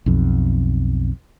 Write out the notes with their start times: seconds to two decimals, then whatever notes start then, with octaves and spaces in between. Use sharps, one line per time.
0.06 B1 F2